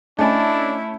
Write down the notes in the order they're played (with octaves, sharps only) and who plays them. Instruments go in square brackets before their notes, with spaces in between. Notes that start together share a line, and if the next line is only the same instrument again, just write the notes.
[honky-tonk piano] A3 C#4 [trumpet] D4 [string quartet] E4 [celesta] D#5 G#5 A6